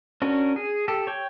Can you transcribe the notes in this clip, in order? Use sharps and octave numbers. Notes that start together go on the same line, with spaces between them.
C#4 D4 F#4 A#4
G#4
G4 A4
C#5 G5